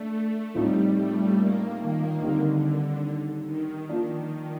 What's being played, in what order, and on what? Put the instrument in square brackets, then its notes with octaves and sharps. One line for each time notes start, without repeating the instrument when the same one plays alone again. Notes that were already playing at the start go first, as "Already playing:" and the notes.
Already playing: [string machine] A3 [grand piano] D4
[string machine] A3
[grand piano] A2 F3 C4 D#4 [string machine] G3
[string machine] A3
A#3
D#3
[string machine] D3 [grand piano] D#3 G3 C4 D#4
[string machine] D3
D#3
[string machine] D#3 [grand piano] F3 A#3 D4